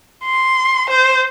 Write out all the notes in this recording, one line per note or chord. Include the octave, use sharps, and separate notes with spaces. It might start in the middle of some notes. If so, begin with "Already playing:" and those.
C6
C5